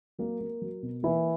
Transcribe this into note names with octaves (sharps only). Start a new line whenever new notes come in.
F#3 A#3 A#4
A#3
F#3
B2
E3 A#3 E4